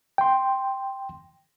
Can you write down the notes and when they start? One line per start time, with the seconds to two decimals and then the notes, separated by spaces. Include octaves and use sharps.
0.18 G5 C6